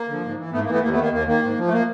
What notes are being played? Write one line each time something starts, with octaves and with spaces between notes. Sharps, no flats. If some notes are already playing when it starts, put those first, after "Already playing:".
Already playing: A#3
D3 F3
G#2
E3
G#2 A3 B3
A#3
E3
A3 B3
D#2 A#3
A3 B3
D#3 A#3
D#2 A#3
D#3 A#3
G#2
F3
A3
A#3